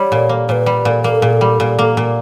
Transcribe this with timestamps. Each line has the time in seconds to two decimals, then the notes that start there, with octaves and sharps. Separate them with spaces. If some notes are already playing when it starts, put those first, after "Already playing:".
Already playing: G3 C#5
0.12 A#2
0.29 A#3
0.48 A#2 B4 C#5
0.66 G3
0.85 A#2
1.04 A#3 A#4
1.14 A4
1.22 A#2 G#4
1.33 A4
1.41 G3
1.60 A#2
1.79 A#3
1.97 A#2